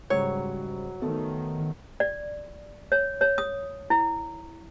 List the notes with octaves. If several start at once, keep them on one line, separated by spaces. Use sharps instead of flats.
G#2 C#3 F#3 G3 C#5
D#3 A3 B3 A4
D5
C#5
C#5
D#6
E4